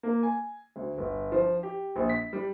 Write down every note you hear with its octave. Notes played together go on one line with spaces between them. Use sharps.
A#3
G#5
D2
G1
F3
G4
A#1
B6
G3